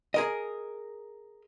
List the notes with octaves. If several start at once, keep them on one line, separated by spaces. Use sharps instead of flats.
G#4 A#4 D#5